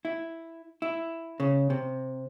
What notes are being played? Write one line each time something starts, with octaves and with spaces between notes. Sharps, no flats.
E4
E4
C#3
C3